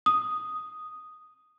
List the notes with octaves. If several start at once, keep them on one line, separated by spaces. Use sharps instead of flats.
D#6